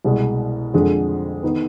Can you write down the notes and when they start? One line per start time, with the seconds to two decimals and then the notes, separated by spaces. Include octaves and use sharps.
0.05 C2 B2 G#3
0.74 F2 D3 G#3
1.43 D#3 B3